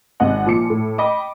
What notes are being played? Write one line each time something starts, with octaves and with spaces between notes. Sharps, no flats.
G#1 C3 D#5 F#5
A#2 F3 D6 C#7
A2
D#5 G5 B5 D6